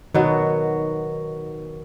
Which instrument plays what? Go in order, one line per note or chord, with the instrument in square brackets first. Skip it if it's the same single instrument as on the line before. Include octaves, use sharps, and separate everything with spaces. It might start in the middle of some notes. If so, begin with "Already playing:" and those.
[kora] B2 F#3 B3 [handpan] D#3 F#4